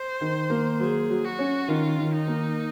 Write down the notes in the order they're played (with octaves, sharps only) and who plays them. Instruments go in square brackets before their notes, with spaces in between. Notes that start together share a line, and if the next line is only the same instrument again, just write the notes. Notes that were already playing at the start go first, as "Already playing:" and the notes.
Already playing: [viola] C5
[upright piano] D#3
A#3
[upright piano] F#3 [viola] G#4
[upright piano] F#3
[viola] F#4
[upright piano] C#4
[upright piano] D#3 [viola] F4
[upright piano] D#3
[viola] D#4
[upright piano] A#3